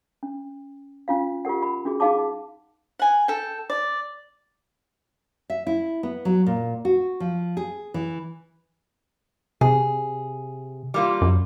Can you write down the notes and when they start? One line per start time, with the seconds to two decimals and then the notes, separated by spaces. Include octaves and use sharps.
0.23 C#4
1.08 C#4 F4 F5
1.45 F4 G4 A#4 F#5
1.63 B5
1.85 C#4 F#4 G#4
2.00 D#4 G#4 F5 F#5 A5 D6
2.99 F#5 G#5
3.28 A4 G5
3.70 D5
5.50 E5
5.67 E4
6.03 B3
6.25 F#3
6.46 A#2
6.85 F#4
7.20 F3
7.57 G#4
7.94 E3
9.61 C3 G#4
10.94 G3 A#3 F4
11.21 F#2